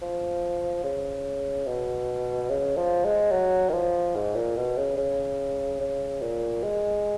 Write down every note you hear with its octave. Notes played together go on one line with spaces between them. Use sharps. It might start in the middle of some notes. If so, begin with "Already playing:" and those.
F3
C#3
B2
C#3
F3
G#3
F#3
D#3
F3
G#2
A#2
B2
C#3
C#3
C#3
A#2
G#3